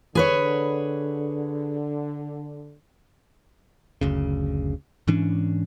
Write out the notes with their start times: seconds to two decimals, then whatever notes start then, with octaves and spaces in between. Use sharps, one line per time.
0.15 D3 G#4 B4 C#5
4.01 F#1 D2 C#3
5.08 G#2 E3 C#4 D4